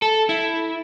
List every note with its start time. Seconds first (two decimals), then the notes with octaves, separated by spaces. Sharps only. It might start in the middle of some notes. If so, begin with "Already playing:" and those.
0.02 A4
0.29 E4